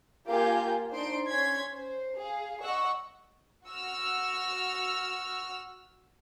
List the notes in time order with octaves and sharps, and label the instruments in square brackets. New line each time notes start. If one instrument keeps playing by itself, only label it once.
[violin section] A#3 F4 G4 A#4 G#5 G6
D4 D#4 C5 C6 D7
C#4 C6 G#6 B6
C5
G#4 F5
D#5 F#5 C#6 E6
F#4 E6 F6